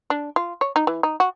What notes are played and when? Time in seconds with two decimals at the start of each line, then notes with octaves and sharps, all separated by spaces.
0.10 D4
0.36 F4
0.61 C#5
0.76 D#4
0.87 E3
1.03 D#4
1.20 F#4